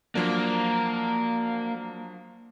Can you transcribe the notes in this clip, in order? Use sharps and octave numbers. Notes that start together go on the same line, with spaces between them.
F3 F#3 A#3 D4